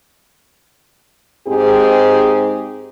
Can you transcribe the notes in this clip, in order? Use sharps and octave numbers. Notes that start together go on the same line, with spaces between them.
G#2 C4 D#4 G4 G#4